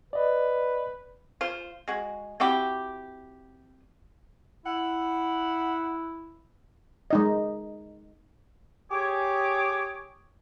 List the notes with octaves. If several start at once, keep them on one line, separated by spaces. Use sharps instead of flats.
B4 D5 D#5
F4 C5
G#3 F#4
C4 E4 F#4 G4
E4 F#5
G#3 D#4 D#5
G4 G#4 C#5 D6